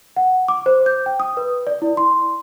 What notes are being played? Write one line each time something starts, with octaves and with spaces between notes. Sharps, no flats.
F#5
D6
C5
G6
G5
D#6
B4
D5
E4
C6